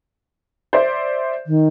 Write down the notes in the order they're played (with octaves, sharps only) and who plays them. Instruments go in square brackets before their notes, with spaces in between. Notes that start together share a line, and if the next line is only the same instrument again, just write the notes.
[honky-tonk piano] C5 D5 E5
[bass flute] D#3